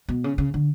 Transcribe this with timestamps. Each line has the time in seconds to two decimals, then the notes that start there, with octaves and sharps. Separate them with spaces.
0.09 B2
0.24 C#3
0.38 C#3
0.54 D3